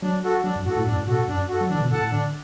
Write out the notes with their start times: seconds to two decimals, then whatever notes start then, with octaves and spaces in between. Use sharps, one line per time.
0.02 F#3 D4
0.24 F#4 A4
0.44 F#3 D4
0.56 F#2
0.66 A2 F#4 A4
0.76 A2
0.87 F#2 D4
0.97 A2
1.08 B2 F#4 A4
1.28 F#2 D4
1.49 F#4 A4
1.61 F#3
1.70 E3 D4
1.75 D3
1.80 B2
1.91 A2 A4 F#5 A5
2.02 A2
2.12 D3 D4